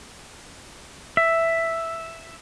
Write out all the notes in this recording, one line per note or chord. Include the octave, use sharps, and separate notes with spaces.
E5